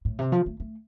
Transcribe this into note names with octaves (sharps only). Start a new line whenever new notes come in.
A2
C3
F3
A3
A3